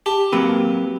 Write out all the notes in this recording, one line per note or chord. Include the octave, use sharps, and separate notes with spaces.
G4 A5
F#3 A#3 C4 B4